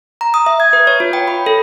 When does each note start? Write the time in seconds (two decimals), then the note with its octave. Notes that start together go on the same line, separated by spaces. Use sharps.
0.21 A#5
0.34 D#6
0.46 E5
0.60 G#6
0.73 B4
0.87 C#5
1.00 F4
1.13 G5
1.28 B5
1.46 A4